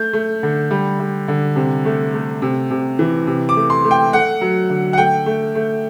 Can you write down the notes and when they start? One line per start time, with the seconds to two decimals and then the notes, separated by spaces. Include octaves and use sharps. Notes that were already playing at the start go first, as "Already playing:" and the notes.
Already playing: A3 G6
0.13 A3
0.43 D3
0.71 G3
1.00 G3
1.28 D3
1.56 C3
1.85 A3
2.14 A3
2.42 C3
2.71 C3
2.99 E3
3.27 C3
3.49 D6
3.56 A3
3.70 C6
3.84 A3
3.91 G5
4.13 A3 F#5
4.41 F#3
4.70 D3
4.93 F#5
4.98 A3 G5
5.26 A3
5.55 A3